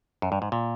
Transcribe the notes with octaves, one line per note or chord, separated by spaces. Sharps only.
F#2
G2
G#2
A#2